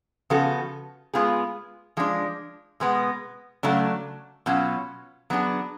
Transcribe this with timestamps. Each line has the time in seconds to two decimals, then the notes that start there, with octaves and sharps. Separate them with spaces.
0.30 C#3 F3 B3 F#4 A4
1.14 G#3 B3 F4 G#4
1.97 F3 G#3 D4
2.80 B2 G#3 B3
3.63 C#3 F#3 A3 D4
4.46 B2 F#3 C#4 F4
5.30 F#3 B3 D4 G#4